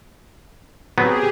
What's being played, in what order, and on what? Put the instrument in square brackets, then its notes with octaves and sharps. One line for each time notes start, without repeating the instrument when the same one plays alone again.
[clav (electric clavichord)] F#3 B3 C4 [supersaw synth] G4 G#4